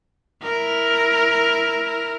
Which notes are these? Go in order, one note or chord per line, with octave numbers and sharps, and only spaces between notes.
E4 A#4